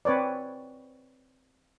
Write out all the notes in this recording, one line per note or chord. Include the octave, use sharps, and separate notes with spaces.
C4 B4 C#5 D5